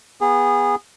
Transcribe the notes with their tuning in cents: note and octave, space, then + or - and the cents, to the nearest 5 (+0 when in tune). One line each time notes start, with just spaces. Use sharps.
B3 -15 G#4 -25